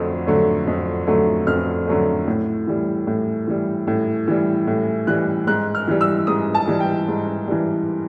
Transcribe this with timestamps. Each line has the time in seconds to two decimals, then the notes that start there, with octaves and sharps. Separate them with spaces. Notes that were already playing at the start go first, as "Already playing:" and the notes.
Already playing: F2 D3 F#3 A3
0.27 D3 F#3 A3
0.67 F2
1.07 D3 F#3 A3
1.47 F2 F6
1.87 D3 F#3 A3
2.27 A2
2.67 E3 G3
3.07 A2
3.47 E3 G3
3.87 A2
4.28 E3 G3
4.67 A2
5.07 E3 G3 F#6
5.47 G#2 F#6
5.75 F6
5.88 E3 G3
6.01 E6
6.27 G#2 D#6
6.55 A5
6.67 E3 G3
6.80 G5
7.08 G#2
7.48 E3 G3